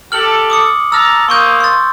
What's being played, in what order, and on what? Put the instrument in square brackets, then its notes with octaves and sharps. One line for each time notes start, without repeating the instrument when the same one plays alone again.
[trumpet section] G4 A4 [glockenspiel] F6 F#7
[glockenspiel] D6 D#6 C#7
[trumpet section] A5 A#5 [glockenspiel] E6 F6
[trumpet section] A#3 C5 D#6 [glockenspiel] C6 C#6 G6
[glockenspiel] C6 A6